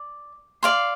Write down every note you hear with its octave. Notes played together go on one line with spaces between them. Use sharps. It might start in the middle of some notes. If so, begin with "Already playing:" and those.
Already playing: D5
D5 F5 C6